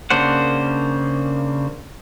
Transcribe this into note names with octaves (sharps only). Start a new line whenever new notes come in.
C#3 A#3 D4 C5 F#5